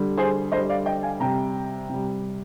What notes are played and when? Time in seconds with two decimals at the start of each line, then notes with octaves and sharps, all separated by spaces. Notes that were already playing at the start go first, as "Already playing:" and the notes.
Already playing: D3 G3
0.17 G#4 C5
0.52 D3 C5 D#5
0.56 G3
0.69 D5 F5
0.86 D#5 G5
1.03 F5 G#5
1.20 C3 G3 G5 A#5
1.89 C3 G3